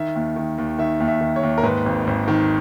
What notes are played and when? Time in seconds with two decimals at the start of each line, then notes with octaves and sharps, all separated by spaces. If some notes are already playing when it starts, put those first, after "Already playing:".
Already playing: D#3 E5
0.16 D#2
0.36 D#3
0.58 D#2
0.78 D#3 E5
1.00 D#2
1.08 E5
1.21 D#3
1.36 C#5
1.43 D#2
1.58 A#4
1.63 G#2 B4
1.86 G#1
2.07 G#1
2.28 D#3